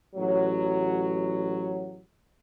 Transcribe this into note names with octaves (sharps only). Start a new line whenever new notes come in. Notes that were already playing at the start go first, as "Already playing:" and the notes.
A1 F#3